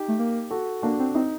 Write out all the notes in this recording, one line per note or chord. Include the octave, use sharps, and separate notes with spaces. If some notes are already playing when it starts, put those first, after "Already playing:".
Already playing: D#4 G4
A3
A#3
F#4 A4
A#3 D4 F#4
C4
C4 D#4